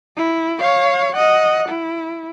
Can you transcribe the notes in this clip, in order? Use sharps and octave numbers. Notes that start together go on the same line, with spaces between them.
E4
C#5 F5
D#5 F#5
E4